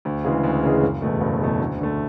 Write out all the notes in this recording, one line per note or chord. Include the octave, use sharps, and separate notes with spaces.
D2
C#3 E3 G#3
D2
C#3 E3 G#3
F#1
E2 B2 A3
F#1
E2 B2 A3
D2
D3 A3